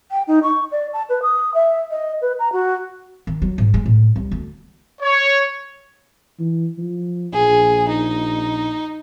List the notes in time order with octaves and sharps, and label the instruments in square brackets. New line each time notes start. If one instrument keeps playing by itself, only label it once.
[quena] G5
D#4
C#6
D5
A5
B4
D#6
E5
D#5
B4
A#5
F#4
[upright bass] D#3
F#3
G#2
G#3
A2
C2
D2
[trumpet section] C#5
[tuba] E3
F3
[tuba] A#1 [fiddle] G#4
[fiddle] D#4